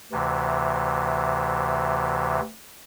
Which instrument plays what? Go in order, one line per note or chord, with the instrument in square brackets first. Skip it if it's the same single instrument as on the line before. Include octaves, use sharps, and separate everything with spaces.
[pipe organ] D2 C3 E3